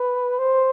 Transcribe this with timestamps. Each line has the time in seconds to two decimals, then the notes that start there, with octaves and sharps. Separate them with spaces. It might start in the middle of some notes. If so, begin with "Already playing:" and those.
Already playing: B4
0.39 C5